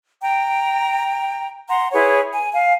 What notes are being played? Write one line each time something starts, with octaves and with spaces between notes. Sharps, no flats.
G5 A#5
F#5 A#5 C6
E4 G#4 B4 C#5
G#5
F5 G#5